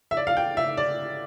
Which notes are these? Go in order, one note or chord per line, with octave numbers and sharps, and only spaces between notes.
E5
D5
F5
G5
E5
D5